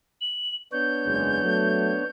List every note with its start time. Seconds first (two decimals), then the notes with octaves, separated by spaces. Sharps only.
0.21 F#7
0.72 B3 D4 C#5 G6
1.04 F#1 E2 G#3
1.43 F#3 A3